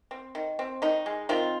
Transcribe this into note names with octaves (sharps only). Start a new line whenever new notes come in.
C4
D#3
C4
D#3 D#4
G#3
D#3 C4 F4